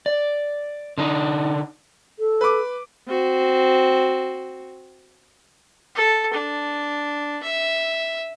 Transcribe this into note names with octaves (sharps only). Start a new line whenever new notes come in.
D5
D3 D4 D#4
A4
B4 D6
C4 F#4
A4
D4
E5